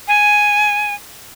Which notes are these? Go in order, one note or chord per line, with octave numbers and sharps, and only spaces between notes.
G#5